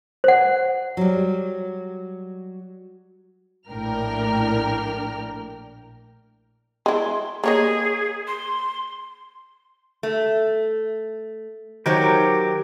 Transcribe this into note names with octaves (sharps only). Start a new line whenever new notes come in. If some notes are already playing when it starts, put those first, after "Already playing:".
C5 F#5
F#3 G3
A#1 A2 D4 A#4 G5 F6
G#3 E4 C6
A#3 G#4 C#5 D#5
C6
A3
D#3 F#3 G4 A#4 C5